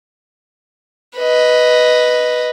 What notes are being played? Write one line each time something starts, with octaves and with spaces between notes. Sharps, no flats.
B4 D#5